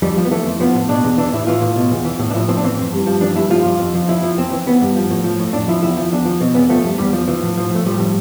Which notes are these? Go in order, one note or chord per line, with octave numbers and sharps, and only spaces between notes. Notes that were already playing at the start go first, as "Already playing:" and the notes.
F2 G3
F3
B3
E3 A3
F2
F3 B3
A2
B2 D4
E2
E3 D4
A2 E4
E3 F4
A2
B2
E2
E3
A2
D4
F3 E4
A2 C4
D4
E3 C4
F2
G2
F3
E3 D4
G2 E4
F3 F4
G2
F2
F3
F2 E4
F3
F2 C4
E3
E3 B3
G2
F3
A2
F3
A2
F2 D4
F3 E4
E2 E4
F3
E2 D4
F3
B2 C4
E2 B3
F3 A3
G2
E2 G3
F3
E3 F3
A2
F3
A2 A3
F3 G3
A2